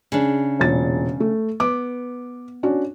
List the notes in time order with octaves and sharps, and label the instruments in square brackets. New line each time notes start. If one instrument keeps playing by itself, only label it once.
[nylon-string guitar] C#3 D4
[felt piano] E1 A#2 A6
A3
[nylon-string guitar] B3 [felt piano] D6
[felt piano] C#4 D4 F#4